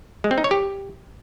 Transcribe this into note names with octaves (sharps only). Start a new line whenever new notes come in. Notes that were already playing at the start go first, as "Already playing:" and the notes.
G#3
C4
D#4
C#5
G4